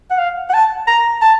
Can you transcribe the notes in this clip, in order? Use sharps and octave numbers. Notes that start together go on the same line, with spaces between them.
F#5
F5
F#5
A5
A#5
A5